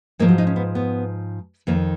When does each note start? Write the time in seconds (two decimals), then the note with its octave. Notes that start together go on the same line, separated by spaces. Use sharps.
0.19 G#2 F3 A#3
0.28 F#3
0.38 D#4
0.47 C#4
0.56 B3
0.75 B3
1.67 F2 D#3 A#3